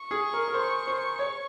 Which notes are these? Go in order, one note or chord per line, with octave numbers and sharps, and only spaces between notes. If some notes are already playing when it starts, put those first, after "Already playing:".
Already playing: C#6
G#4
A#4
A#4
C5
C5
C#5